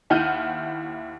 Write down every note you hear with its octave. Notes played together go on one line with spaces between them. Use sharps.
D#2 E4 F#5 F6 G6 D#7